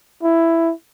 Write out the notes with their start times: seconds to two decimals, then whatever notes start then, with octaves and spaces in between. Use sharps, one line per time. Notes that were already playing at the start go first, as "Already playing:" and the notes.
0.23 E4